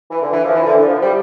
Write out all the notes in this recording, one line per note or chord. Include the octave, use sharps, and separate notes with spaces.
E3
D3
E3
F3
E3
D3
D3
F3
G3